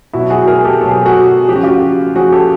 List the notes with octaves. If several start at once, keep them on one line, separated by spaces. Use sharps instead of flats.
B2 F#3 E4 F#4
F#4 G#4
G#4 A#4
G4 A4
B2 F#3 A4
G#4
G4
F#4 G#4
F3 G4
C#3 F#4
F4 G4
C#3 F3 F#4 G#4
G4 A4